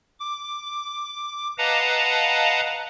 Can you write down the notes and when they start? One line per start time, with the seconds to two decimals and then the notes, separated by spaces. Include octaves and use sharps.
0.20 D6
1.58 B4 D#5 F5 F#5 A5 A#5